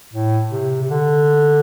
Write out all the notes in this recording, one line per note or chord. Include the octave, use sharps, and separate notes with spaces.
A2
C3
C3
D3